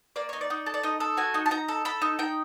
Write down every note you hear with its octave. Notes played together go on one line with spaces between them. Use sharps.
A#3 D5
D#4 C#5
D5
D#4
A4
D5
D#4 D#5
A4
F#4 G#5
D#4
A5
D#4 A#5
A4
A4 B5
D#4
D#4 G5